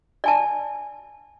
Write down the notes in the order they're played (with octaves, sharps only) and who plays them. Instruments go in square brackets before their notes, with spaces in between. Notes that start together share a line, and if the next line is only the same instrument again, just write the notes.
[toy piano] D5 G#5 A5